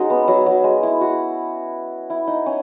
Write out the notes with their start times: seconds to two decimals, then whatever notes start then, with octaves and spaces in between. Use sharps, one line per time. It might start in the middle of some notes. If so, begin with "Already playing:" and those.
Already playing: G#3 C#4 D#4 F#4
0.10 B3
0.28 F#3
0.46 F#3
0.64 G#3
0.83 E4
1.01 F#4
2.10 E4
2.27 D#4
2.46 C#4